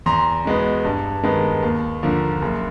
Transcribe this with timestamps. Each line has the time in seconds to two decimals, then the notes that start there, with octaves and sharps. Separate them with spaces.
0.06 E2 A#5 C6
0.45 B2 G#3 B3
0.85 G2
1.24 D#3 G#3 B3
1.62 D#2
2.03 D3 F3 A#3
2.42 F#1